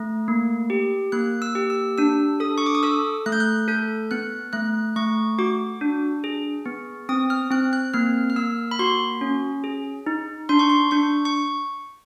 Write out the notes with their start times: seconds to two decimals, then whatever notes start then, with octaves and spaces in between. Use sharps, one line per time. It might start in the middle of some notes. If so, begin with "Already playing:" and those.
Already playing: A3
0.28 A#3
0.70 G4
1.12 A#3 F#6
1.42 E6
1.55 G4
1.70 E6
1.98 D4 E6
2.40 A4 D#6
2.58 C#6
2.66 D6
2.75 D#6
2.83 A4 E6
3.26 A3 F#6
3.32 G6
3.40 F#6
3.68 A4 G6
4.11 B3 F#6
4.53 A3 F#6
4.96 A3 C#6
5.39 F#4 D6
5.81 D4
6.24 G#4
6.65 B3
7.09 C4 D#6
7.30 F6
7.51 C4 F#6
7.73 F#6
7.94 A#3 F6
8.30 F6
8.36 A#3 E6
8.71 B5
8.79 F#4 C6
9.21 C#4
9.64 G#4
10.06 D#4
10.49 D4 C6
10.59 C#6
10.69 C6
10.91 D4 C#6
11.25 C#6